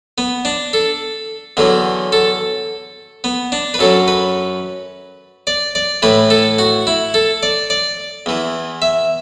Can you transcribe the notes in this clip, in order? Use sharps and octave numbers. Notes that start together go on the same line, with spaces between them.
B3
D4
A4
E2 D3 F#3
A4
B3
D4
B4
F#2 F#3 A4
B4
D5
D5
A2 E3 B4
A4
F#4
E4
A4
D5
D5
E2 E3
E5